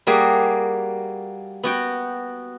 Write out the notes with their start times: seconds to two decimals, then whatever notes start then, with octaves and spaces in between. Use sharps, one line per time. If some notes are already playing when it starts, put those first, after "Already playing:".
0.07 G3 A#3 F#4 G#4
1.63 B3 F#4 G5